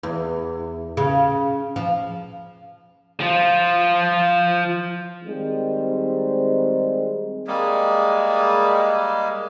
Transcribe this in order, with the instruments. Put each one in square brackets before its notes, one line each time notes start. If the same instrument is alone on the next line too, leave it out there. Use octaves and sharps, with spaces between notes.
[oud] E2
C#3
F3
[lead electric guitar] F3 F4
[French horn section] D#3 G3 G#3 C4
[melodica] G3 G#3 A#3